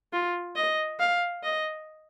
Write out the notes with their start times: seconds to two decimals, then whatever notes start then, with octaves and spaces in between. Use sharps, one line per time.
0.13 F4
0.56 D#5
1.00 F5
1.43 D#5